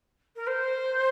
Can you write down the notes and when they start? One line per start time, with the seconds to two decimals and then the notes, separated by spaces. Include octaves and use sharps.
0.36 A#4
0.47 C5